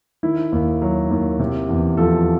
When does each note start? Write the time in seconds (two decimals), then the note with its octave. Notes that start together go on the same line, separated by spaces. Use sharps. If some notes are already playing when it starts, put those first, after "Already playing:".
0.23 D#3 E4
0.52 D#2
0.82 F#3
1.11 D#2
1.39 C3
1.69 E2
1.97 F3 A4